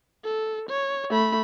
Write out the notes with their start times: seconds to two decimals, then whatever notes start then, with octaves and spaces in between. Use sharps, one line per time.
0.24 A4
0.69 C#5
1.10 A3 B5